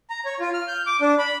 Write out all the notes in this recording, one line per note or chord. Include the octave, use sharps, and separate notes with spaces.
A#5
C#5
F4
F6
G6
D6
D4
B5